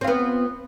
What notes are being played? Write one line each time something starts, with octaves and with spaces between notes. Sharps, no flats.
B3 C4 F4